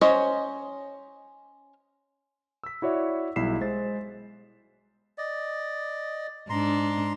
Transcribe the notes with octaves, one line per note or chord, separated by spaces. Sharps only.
C#4 C5 C#5 D#5
E6 B6
E4 F#4 C#5 D5 E5
B1 G3 E4 B6 C7 E7
G#3 C5 A6
D5 D#5
G#2 D4 A#5 C6